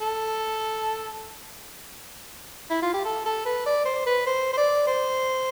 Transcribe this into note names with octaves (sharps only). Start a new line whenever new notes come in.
A4
E4
F4
G4
A4
A4
B4
D5
C5
B4
C5
C5
D5
C5